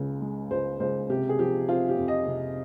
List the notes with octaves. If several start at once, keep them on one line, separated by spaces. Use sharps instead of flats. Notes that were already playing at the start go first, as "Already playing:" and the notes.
Already playing: C#2 C#3 G#3
G#3
C#2 C5
C#2 C5
C3 G4
G#4
F3 G4
C4 F4
G4
F2
D#5
C3